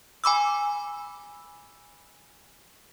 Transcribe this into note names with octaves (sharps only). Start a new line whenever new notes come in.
G#5 B5 D6 E6